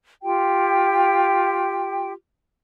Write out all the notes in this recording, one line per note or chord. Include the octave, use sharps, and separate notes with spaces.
F4 G4 G5